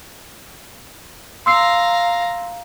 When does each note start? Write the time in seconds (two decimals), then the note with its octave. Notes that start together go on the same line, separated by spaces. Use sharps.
1.46 F5 A#5 C6 E6 C7